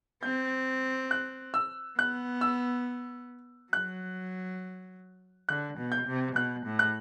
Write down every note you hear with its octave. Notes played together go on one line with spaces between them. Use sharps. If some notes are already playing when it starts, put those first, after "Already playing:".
C4 G6
F#6
E6
B3 F#6
E6
F#3 F#6
D3 F#6
B2
G6
C3
B2 F#6
A2
F#6